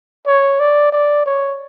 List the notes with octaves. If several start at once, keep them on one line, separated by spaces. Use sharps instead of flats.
C#5
D5
D5
C#5